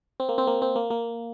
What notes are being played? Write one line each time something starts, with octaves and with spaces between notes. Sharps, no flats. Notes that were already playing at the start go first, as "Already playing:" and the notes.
C4
A#3
C4
A#3
C4
A#3
A#3